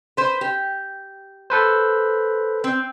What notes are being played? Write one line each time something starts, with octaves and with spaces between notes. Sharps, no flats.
B4 C5
G4
A4 B4 C5
C4